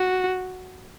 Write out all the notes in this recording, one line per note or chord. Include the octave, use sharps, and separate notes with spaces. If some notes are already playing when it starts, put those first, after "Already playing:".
Already playing: F#4